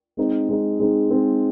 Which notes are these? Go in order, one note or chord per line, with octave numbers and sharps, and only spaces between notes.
G#3 C4 D#4
G#3 C4 D#4
G#3 C4 D#4
G#3 C4 D#4